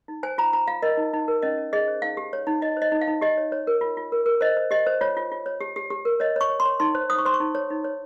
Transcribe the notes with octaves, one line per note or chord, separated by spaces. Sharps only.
D#4
C5 G#5
F4 A#5
F4 A#5
F4 F5
A#4 D#5
D#4
D#4
A#4
C#4 D#5
C#4
G#4 D#5
C5
D#4 F5
G4
C#5
D#4
D#4 D#5
C5 D#5
D#4
F5
D#4
G4 D#5
C#5
C#5
A#4
F4
F4
A#4
A#4
C5 D#5
C5
G4 D#5
C5
F4 C#5
F4
F4
C#5
G4
G4
G4
A#4
C#5 D#5
C#5 C#6
C#5
C6
C#5
D#4 C6
C5
C5 D#6
C#6
C5 C6
C#6
D#4
C#5
D#4
C#5